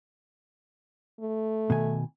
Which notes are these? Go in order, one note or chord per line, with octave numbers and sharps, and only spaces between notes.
A3
B2 D#3 G#5